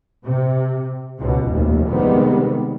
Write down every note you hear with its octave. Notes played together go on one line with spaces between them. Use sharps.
C3
C#2 B2
F1 D#2
C3 D#3 G3 G#3 B3